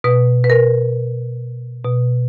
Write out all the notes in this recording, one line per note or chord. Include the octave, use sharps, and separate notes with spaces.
B2 B4
B4
A#4
B2